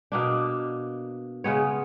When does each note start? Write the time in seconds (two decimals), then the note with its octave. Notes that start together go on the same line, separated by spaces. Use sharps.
0.12 B2 A#3 D4
1.44 C#3 G#3 B3 C#5